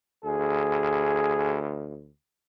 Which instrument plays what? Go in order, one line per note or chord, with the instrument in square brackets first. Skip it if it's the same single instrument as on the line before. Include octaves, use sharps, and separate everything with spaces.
[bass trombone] D2 [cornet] G#4